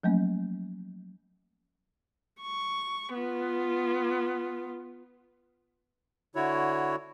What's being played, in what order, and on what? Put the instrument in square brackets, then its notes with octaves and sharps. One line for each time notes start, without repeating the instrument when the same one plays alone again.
[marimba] F3 F#3 A3 A#3 C#4
[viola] C#6
B3 F4
[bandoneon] D3 E4 F#4 C#5